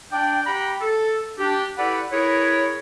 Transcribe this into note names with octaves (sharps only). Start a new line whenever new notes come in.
D4 D5 G5
G4 F#5 G5 A#5 B5
A4
D4 G4
E4 G4 A4 B4 D5 F#5
E4 G#4 A#4 B4 C#5